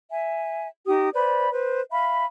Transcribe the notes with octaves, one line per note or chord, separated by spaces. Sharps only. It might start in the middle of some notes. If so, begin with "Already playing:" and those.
E5 G#5
D#4 G4 D#6
B4 C5 D5 B5
B4 C5
E5 F5 B5